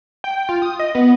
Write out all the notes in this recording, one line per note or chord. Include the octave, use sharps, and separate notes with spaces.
G5
F4
D#6
D#5
B3